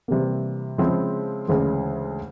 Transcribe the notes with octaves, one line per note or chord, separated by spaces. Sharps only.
C3 E3 G3 A#3
C#3 F3 G#3 C4 E4
D2 C#3 E3 G#3